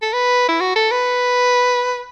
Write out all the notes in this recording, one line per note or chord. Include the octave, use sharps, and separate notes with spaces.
A4
B4
E4
F#4
A4
B4